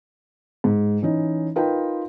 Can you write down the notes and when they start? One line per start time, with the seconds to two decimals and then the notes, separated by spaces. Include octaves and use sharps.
0.64 G#2
1.02 E3 C#4 D#4
1.56 D#4 F4 A#4 B4 G5